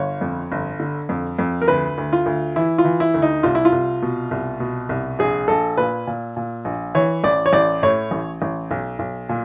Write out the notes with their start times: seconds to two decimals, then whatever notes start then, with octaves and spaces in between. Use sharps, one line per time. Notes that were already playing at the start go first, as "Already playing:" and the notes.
Already playing: G1 C#5
0.21 F2
0.52 G1
0.80 D3
1.09 F2
1.39 F2
1.62 A#4
1.68 D2 B4
1.98 D2
2.13 F4
2.26 D2
2.56 E3 E4
2.78 F4
2.85 E3
3.00 E4
3.14 D2
3.22 D#4
3.43 C2 F4
3.55 E4
3.65 F4
3.72 C2
4.02 B2
4.31 C2
4.60 B2
4.89 C2
5.19 A#1 G#4
5.48 A#1 A4
5.77 A#2 B4
6.07 A#2
6.37 A#2
6.65 A#1
6.95 E3 C#5
7.24 A1 D5
7.46 C#5
7.53 A1 D5
7.83 A2 C#5
8.11 A1
8.42 A1
8.71 B1
8.99 B1
9.29 A#2